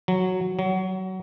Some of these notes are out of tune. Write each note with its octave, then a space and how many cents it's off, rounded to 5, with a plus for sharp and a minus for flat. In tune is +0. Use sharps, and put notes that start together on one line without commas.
F#3 -5
F#3 +20